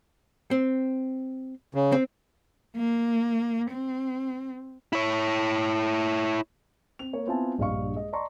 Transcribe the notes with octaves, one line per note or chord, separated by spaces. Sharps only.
C4
C#3
C4
A#3
C4
E4 C#5
C4 F7
A#3 C#5
B3 C4 E4 F4 G#5 A5
A#1 G2 D#5 F5 C#6
G#3 D#5
D5 D#5 A5 A#5 C6 C#6